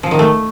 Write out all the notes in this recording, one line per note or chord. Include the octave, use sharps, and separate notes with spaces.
F3
D#3
A3